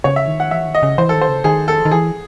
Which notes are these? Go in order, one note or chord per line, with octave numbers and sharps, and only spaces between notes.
C#3 C#5
E5
D#3
F#5
E3 E5
D#3
D#5
C#3
E3 C5
A4
D#3
C5
C#3
D#3 G#4
A4
D#3
E3 G#4